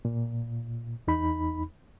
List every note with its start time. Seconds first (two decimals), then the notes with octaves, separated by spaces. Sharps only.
0.05 A#2
1.08 E2 D#4 B5